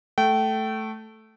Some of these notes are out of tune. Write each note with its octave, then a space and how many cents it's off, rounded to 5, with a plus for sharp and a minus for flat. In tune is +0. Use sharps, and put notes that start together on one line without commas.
A3 -5 G5 -30